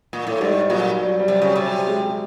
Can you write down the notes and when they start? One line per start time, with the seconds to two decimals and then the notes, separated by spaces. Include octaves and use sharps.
0.13 A#2
0.27 A2
0.41 G#2 G3
0.70 A#2 F#3
0.99 G3
1.19 G3
1.28 C3 F#3
1.42 C#3
1.56 C3 G3
1.87 G#3